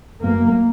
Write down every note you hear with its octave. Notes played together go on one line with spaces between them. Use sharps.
F#2 A#3